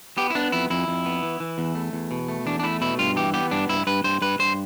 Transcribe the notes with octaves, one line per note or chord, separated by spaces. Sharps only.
B3 G4
E4
B3 D4
F2 E4
F2 E4
F2
B3
E3
E3
E2
A3
E2
B2
A3
E2 D4
D4
A3 E4
B2 E4
G2 F4
E3 G4
B3 G4
G2 D4
G2 E4
G2 B4
G2 C5
G2 B4
G2 C5